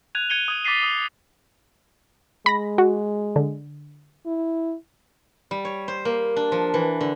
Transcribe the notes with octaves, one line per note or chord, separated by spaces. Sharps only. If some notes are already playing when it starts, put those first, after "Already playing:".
F#6 G#6 D#7 F7
G#6 C#7 D#7 G7
D#6 G#6 D#7
D6 A6 B6 C7 D#7
D6 D#6 A6
G#3 B5 A#6
F#4
D3
E4
G3
C#5
C5
A#3
D4
F3
E3
D3